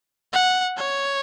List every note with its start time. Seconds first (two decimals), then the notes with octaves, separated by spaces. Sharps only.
0.33 F#5
0.77 C#5